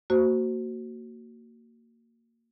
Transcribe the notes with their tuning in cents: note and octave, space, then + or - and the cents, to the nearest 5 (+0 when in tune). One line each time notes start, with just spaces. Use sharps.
A#3 -20 F#4 +10 C5 +0